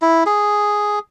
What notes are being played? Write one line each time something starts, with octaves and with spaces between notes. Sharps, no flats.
E4
G#4